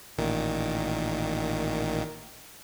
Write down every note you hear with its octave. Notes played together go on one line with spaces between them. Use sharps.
A1 A#2 D#3